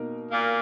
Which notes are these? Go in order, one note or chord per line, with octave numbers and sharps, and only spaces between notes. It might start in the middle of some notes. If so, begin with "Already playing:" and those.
Already playing: B2 A#3 D#4 A#4
A#2 A#3